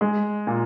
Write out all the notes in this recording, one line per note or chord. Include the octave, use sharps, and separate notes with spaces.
G#3
A#2